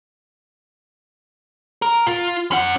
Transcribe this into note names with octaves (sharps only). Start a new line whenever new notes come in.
A#4
F4
C#4 F#5